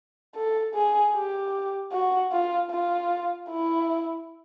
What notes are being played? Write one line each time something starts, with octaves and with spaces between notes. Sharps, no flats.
A4
G#4
G4
F#4
F4
F4
E4